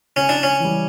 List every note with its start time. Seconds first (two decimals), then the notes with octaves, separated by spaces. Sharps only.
0.16 C#3 C#4
0.29 D4
0.43 C#4
0.60 E3 G3